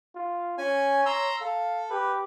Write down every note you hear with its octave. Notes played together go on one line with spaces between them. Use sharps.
F4
C#4 C#5 G#5
A#5 C6 E6
A4 F5
G4 B4